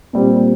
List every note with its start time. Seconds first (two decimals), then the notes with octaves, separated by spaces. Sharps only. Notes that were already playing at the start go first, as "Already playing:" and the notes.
0.13 A#2 G3 C4